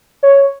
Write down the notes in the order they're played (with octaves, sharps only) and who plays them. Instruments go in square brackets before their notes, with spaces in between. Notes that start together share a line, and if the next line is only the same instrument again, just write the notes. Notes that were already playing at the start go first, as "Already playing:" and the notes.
[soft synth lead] C#5